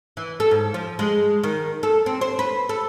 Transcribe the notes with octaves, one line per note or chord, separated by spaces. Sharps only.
E3
A4
G#2
F3
G#3
D#3
A4
C4
C5
B4
A4